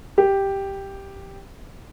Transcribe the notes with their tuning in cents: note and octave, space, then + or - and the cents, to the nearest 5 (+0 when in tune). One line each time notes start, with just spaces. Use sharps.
G4 +0